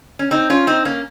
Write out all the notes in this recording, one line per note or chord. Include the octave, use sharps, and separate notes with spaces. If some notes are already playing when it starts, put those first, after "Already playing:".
C#4
C4 D#4
C#4 F4
C4 D#4
A#3 C#4